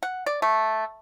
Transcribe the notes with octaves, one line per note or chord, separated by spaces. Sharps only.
F#5
D5
A3